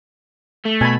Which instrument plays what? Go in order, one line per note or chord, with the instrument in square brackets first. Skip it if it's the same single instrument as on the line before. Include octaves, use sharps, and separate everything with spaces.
[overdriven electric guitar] A3
[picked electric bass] B2 [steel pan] G#5 A5 B5